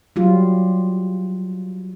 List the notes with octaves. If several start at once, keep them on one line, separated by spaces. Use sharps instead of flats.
F#3 G3 F4